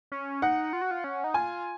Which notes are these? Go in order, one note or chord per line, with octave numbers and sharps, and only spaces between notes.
C#4
D#4 F#5
F4
F#4
F4
C#4
D#4
F4 G#5